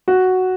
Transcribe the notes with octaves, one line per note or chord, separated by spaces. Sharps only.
F#4